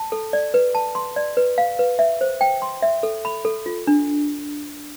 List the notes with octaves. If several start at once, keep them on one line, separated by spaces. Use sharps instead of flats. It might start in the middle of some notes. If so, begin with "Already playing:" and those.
Already playing: A5
A4
D5
B4
A5
C6
D5
B4
F5
B4
E5
C5
G5
C6
E5
A4
B5
A4
F4
D4